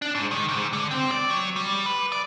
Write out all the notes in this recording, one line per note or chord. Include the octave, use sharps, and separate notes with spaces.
D4
G#2
D#3
G#2
D3
C4
D5
F#3
G3
B4
D5